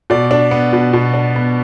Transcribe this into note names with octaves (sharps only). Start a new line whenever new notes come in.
B2 D5
D4
B3
B2
B2
D4
B3